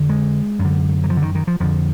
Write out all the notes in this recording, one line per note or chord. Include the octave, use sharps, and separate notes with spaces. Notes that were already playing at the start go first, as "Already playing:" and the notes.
Already playing: F2 D3
G#3
F#2
D3
F#3
F3
D3
D#3
D#3
F3
F2 D3 F3